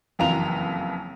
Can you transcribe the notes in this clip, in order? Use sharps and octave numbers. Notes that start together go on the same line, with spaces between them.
F#1 F2 E3 F5 A#5 F7